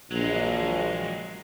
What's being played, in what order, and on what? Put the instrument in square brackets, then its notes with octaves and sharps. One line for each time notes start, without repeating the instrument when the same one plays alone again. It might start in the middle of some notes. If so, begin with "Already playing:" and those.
[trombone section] A#1 [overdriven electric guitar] F#3 G#3